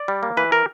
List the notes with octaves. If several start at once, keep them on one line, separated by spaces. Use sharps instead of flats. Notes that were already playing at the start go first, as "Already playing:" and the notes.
Already playing: D5
G3
A#3
E3 B4
A#4